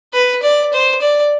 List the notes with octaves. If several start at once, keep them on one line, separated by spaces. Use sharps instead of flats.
B4
D5
C5
D5